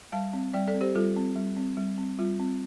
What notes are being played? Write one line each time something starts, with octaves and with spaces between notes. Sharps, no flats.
G3 F5 A5
C4
G3 D5 G5
A4 D5
C4
G4 C5
G3 F4 A4
C4
G3
C4
G3
C4
G3 F4
C4